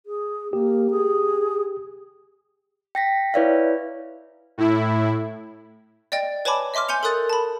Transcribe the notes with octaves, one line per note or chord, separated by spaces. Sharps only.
G#4
A#3 G4
G#4
G5 A#6 B6
E4 B4 C#5 D5 E5 F5
A2 E4
D5 D#5 G5 A6
B4 C#5 G#5 A5 B5 D6
D#5 E5 C6 D6 F6
G#5 C6 G6 C#7 F7
A4 A#4 C6 D#6 F#6 A6
A5 B5